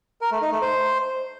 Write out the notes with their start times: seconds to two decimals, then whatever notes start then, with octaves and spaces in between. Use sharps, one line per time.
0.21 A#4
0.31 A3
0.42 D#4
0.52 A3
0.62 C5